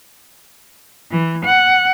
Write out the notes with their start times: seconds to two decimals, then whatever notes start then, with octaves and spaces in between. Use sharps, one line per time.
1.11 E3
1.45 F#5